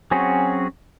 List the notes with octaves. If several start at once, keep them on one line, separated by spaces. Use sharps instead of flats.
F#3 C4 C#4 F#4 G#4